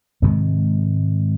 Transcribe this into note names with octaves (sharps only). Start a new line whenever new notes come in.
G#2 C3 D#3 G#3